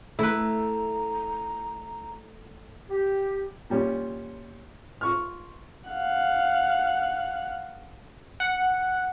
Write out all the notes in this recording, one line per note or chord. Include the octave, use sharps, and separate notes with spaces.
A3 E4 B4 A#5
G4
A#2 G3 C#4 F4
F4 C#6 F6
F5 F#5
F#5